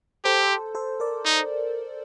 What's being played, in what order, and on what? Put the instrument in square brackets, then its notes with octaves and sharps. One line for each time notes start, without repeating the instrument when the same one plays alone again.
[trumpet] G4 [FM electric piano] A4 C5
[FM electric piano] A4 C5
A#4 D5
[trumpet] D#4